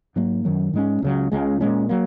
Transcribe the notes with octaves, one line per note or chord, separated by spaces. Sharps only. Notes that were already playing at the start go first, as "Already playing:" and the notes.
G#2 F#3 A#3
F#2 D#3 F#3
G#2 G#3 C#4
C#2 C#3 F#3
C#2 C#3 G#3
A#2 G#3 C#4
F#3 A#3